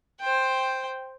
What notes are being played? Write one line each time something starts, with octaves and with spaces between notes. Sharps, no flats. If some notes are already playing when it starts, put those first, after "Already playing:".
C5 G5